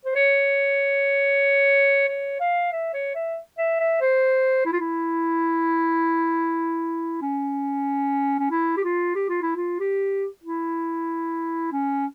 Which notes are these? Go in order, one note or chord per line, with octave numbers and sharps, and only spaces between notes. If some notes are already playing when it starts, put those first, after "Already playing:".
C5
C#5
C#5
F5
E5
C#5
E5
E5
E5
C5
E4
F4
E4
C#4
C#4
E4
G4
F4
G4
F4
E4
F4
G4
E4
C#4